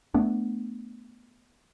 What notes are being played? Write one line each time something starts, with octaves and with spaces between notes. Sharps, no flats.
A3 B3 D4